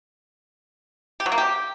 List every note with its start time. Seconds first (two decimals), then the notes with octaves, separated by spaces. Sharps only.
1.20 G4
1.26 F#3
1.32 A#3
1.38 G4